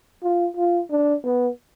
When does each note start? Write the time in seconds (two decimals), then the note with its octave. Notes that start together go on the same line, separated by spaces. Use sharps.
0.23 F4
0.57 F4
0.91 D4
1.24 B3